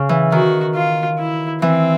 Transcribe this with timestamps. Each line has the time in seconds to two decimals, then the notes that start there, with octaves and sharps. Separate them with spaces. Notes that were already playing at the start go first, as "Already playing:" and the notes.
Already playing: C#3
0.09 E3
0.32 D#3 F#4
0.74 F4
1.18 E4
1.61 E3 C4